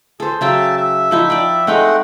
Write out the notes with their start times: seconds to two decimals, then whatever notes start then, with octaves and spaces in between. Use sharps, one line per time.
0.20 G#4 A4 C5
0.41 C#3 F#3 E5 G5 A5
0.76 E5
1.11 F3 D#4 E4
1.30 D5 G5
1.67 G#3 A3 C4 D#4 F#5 G5